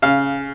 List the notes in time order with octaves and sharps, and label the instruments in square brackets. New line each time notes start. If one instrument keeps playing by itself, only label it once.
[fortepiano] C#3 F5